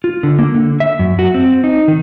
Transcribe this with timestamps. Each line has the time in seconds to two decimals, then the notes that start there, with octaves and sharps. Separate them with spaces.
0.04 F4
0.23 D3
0.39 A#3
0.54 D3
0.80 E5
0.99 F#2
1.19 F#4
1.34 C4
1.64 D#4
1.88 D#3